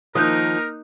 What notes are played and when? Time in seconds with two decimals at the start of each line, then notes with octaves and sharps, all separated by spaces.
0.15 D#3 F3 A#3 D#4 A#4 D#6 F#6 G6